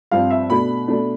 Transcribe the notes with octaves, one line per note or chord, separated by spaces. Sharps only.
G2 F3 C4 F5
E5
B2 A3 D4 B5
B2 A3 D4